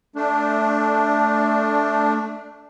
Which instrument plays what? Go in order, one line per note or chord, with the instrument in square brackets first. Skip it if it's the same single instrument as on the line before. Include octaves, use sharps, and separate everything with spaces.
[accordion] A3 D4